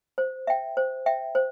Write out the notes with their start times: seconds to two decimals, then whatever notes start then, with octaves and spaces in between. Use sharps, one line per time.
0.18 C5
0.47 E5 G5
0.77 C5
1.06 E5 G5
1.35 C5